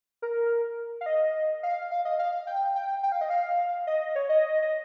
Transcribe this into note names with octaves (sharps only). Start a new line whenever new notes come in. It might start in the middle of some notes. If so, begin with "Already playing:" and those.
A#4
F5
D#5
F5
F5
D#5
F5
G5
G5
G5
F5
D#5
F5
D#5
C#5
D#5
D#5